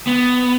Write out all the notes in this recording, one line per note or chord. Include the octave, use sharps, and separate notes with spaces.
B3